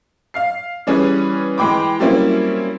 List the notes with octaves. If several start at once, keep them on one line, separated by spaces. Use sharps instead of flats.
F5 F6 C7
E3 G3 C#4 G#4 B4
E3 G#3 G5 B5 D6
F#3 G3 A#3 C4 C#4 E4